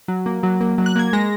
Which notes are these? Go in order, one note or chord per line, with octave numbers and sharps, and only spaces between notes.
F#3
A#3
F#3
A#3
F#3
F#6
A#3 G#6
G#3 A#6